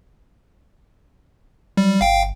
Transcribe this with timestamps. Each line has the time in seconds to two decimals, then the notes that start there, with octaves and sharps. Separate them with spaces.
1.77 F#3 G3
2.01 G1 F5 G5